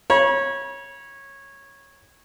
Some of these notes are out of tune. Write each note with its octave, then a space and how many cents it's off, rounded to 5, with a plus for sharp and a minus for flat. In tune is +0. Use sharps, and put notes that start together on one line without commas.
C#5 -15 B5 -45